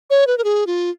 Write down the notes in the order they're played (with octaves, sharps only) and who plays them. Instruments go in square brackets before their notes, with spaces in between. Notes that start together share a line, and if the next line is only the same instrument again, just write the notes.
[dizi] C#5
B4
A#4
G#4
F4